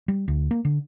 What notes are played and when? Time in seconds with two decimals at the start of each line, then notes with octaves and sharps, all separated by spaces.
0.08 G3
0.28 D2
0.51 A#3
0.65 D3